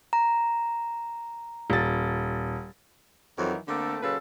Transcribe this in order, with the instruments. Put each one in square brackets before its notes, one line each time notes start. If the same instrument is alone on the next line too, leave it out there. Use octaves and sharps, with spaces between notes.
[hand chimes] A#5
[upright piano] D#1 A6
[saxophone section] F2 D#3 E3 F#3
D3 A3 A#3 C4 A4
A#2 C#3 F#3 F4 A4 B4